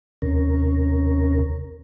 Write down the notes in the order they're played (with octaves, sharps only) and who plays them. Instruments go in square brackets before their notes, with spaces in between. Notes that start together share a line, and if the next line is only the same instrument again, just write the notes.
[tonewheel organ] D#2 C3 C#4 A#4